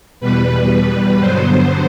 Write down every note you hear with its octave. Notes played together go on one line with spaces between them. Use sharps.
E2 B2 G3 B4
B4
G2 D3 F#3 B3 C5